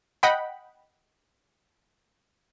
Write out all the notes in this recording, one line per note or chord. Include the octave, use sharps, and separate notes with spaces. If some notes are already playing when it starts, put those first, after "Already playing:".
D#5 F#5 G5 B5